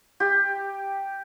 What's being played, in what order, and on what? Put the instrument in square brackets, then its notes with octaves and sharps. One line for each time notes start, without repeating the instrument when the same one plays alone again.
[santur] G4